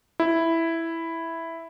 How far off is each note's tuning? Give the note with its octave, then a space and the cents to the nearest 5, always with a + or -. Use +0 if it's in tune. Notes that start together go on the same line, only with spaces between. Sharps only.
E4 +0